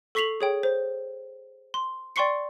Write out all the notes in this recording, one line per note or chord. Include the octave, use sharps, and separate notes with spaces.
A4 C#6 B6 C7 F7 F#7
G#4 C#5 G5
C5
C6
D5 G5 C6 C#6 C7 C#7